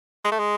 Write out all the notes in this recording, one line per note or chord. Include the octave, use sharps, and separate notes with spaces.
G#3
A3
G#3